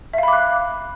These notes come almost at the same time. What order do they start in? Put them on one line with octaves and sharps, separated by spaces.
E5 F5 B5 D6 F#6